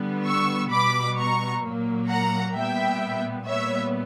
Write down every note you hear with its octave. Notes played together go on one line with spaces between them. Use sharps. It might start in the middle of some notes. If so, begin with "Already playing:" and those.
Already playing: D3 G3 B3
C#6 E6
B2 G3 B3 B5 D6
A#5 C#6
A#2 F#3 A#3
F#5 A#5
A#2 G3 B3 E5 G5
A#2 G3 B3 C#5 E5